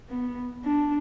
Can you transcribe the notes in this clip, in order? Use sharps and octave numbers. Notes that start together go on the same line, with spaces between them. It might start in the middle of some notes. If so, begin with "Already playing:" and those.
B3
D4